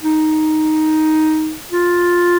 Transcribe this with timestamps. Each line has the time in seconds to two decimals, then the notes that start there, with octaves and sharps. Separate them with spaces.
0.03 D#4
1.72 F4